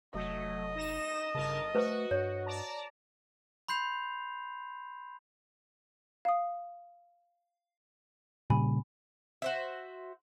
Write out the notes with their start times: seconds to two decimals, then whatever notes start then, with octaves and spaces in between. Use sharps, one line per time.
0.14 F1 F#3 A3 D#5
0.75 D#4 A#6 E7
1.35 G1 C#3 A#4 A5
1.75 A3 F#4 B4 C5 C#6
2.11 G2 C#5
2.46 D5 A5 A#5
3.68 B5 C6 G6 C7 F7
6.25 F5 D#6
8.50 A#2 C#3 G3 G#5 B5
9.42 F#4 C5 E5